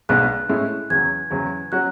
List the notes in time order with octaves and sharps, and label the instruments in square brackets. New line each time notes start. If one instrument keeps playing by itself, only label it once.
[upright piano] B1 B2 G#3 B3 D4 [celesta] F#6
[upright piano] A2 G#3 C#4 E4
[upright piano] E2 C#3 F#3 [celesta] G#6
[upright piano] E2 C#3 F#3
[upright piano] F#3 C#4 F#4 [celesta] F#6